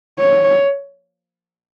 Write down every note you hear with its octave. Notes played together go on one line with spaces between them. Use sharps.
C#5